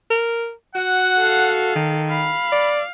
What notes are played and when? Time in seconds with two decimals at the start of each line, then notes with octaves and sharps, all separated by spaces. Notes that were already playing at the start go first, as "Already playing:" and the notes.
0.10 A#4
0.75 F#4 F#5
1.19 A4 F5
1.76 D#3
2.10 F5 B5
2.52 D5